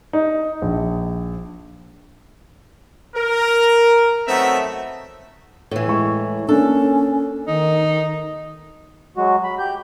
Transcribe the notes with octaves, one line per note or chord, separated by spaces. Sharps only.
D#4
A#1
A#4
F#3 A3 B3 C4 D#4 E5
A2 E3
G#3 C#6
A#3 C#4 D4 A4
D#3 D#4
F#3 G#3 F#4
B5
G4 G6